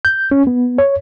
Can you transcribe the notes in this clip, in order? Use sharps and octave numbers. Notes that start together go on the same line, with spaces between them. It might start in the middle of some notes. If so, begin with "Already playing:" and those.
G6
C#4
B3
C#5